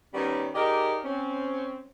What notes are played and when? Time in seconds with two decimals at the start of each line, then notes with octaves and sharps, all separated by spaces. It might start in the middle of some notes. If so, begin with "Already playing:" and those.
0.14 D#3 G3 B3 C#4
0.55 D#4 G4 G#4 A#4 D5 D#5
1.04 C4 C#4